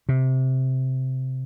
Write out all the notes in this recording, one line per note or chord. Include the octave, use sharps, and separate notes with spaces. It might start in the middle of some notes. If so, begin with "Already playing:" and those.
C3